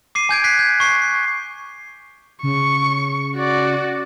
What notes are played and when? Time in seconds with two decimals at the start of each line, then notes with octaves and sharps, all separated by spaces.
0.15 D6 C7 D#7
0.29 G#5 G6 G#6 D7
0.44 F#6 G#6 B6 C7
0.59 G6
0.80 C#6 C7
1.02 C7
2.43 C#3 C#6
3.36 F#4 D5